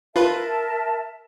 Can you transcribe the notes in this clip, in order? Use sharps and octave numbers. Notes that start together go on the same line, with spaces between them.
F4 A#4 B4 E5 A5